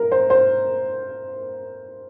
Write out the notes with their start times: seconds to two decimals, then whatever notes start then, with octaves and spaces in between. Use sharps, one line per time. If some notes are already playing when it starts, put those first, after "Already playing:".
Already playing: A#4
0.12 C5
0.30 C5